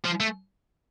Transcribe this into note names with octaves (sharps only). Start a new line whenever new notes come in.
F3
A3